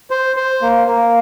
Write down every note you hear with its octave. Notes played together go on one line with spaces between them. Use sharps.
C5
C5
A#3
A#3